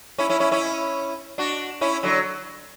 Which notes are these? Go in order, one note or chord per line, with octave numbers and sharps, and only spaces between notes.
C#4 E4
C#4 E4
C#4 E4
C#4 E4
D4 F#4
C#4 E4
D3 F#3